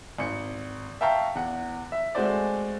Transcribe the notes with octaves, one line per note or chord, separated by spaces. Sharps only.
G#1 C#7
E5 F5 G5 A5 A#5 C#6
E2 F#5
E5
G#3 A3 C4 F#4 C5 D5